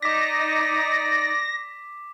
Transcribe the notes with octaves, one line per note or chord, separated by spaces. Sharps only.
D#4 D5 D6 A#6 B6